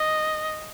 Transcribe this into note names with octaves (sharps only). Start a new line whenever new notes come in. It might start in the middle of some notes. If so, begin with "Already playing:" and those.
Already playing: D#5